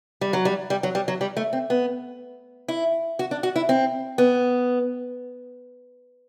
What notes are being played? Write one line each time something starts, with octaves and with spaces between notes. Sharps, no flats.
G3
F#3
G3
G3
F#3
G3
F#3
G3
A3
C4
B3
E4
F#4
D4
F#4
E4
C4
B3